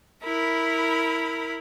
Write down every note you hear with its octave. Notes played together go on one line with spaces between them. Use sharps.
E4 A#4 B5